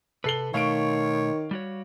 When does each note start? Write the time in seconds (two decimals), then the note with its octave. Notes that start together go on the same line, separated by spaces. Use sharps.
0.24 C3 A4 B4 C7 G7
0.54 B2 D#3 A3 C#5 F5 C#6 D7
1.51 G3 F#4 C#5